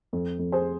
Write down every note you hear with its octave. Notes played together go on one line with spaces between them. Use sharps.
F2
F2
G#4 C5